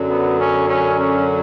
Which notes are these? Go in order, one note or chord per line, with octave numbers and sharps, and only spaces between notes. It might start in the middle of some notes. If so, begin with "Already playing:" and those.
Already playing: F#2 D3 F#3
B3
C#4
C#4
C#4